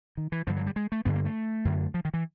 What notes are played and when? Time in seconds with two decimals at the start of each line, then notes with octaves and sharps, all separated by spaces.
0.17 D#3
0.32 E3
0.47 G2 D3 F3
0.57 F#3
0.67 G3
0.76 G#3
0.92 A3
1.05 G2 D3 B3
1.15 A#3
1.25 A3
1.65 F#2 D3
1.94 F3
2.05 D#3
2.14 E3